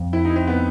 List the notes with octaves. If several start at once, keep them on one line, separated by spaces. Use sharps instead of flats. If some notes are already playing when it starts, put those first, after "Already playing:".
Already playing: F2
C4 E4
D#4
E4
C4
B3